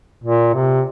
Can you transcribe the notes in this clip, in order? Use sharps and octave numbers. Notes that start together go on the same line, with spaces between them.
A#2
C3